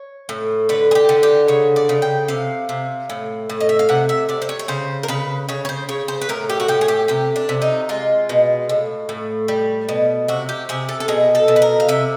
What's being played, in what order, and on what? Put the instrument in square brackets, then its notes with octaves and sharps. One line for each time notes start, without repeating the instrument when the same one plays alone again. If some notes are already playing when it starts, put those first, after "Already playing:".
Already playing: [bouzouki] C#5
A2
D3 B4
G#4
G4
D3
G4
C#3 C#5
D5
C#3
G5
C3 F5
C3
A2
A2
D#5
E5
F5
C3 F#5
E5
C3 D5
C5
C#5
C#5
C#3 C5
A#4
C#3 B4
C#3 C#5
C#5
C5
C#3 C#5
C5
B4
A2 A#4
G4
F#4
A2 G4
G#4
G4
C3 G4
D4
C3
D#4
G#3 F4
B2
A2
A2
G3
B2
C3 F#4
G4
C3 G#4
A4
A4
B2 G#4
A4
B2
B4
A#4
F5
C3 E5